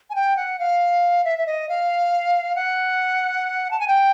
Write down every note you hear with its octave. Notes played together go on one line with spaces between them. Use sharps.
G#5
G5
F#5
F5
E5
E5
D#5
F5
F#5
A5
G#5
G5